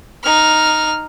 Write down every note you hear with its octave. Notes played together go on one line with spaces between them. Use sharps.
D#4 F6